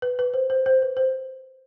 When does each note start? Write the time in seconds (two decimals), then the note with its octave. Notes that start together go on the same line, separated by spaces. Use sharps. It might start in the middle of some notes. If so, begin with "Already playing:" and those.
0.02 B4
0.19 B4
0.34 C5
0.50 C5
0.66 C5
0.82 B4
0.97 C5